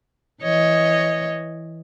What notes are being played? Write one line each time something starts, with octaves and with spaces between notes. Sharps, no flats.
E3 C#5 D#5